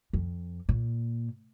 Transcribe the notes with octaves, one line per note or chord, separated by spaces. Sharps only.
F2
A#2